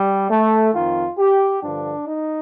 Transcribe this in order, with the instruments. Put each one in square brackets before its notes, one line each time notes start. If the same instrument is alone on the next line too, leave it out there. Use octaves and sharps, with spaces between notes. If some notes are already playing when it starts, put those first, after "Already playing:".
Already playing: [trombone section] G3
A3
F2 D#3 F4
G4
G2 D3 F3 D4
D#4